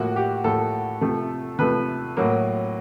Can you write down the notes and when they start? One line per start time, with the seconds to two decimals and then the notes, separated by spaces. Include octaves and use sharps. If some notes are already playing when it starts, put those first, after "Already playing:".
Already playing: A2 F3 A#3 F#4
0.16 G4
0.44 A2 F3 A#3 A4
1.01 C3 F3 A3
1.59 C3 F3 A3 B4
2.17 A2 F#3 A#3